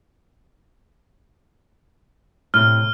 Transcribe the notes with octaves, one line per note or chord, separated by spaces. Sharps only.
A2 C3 F6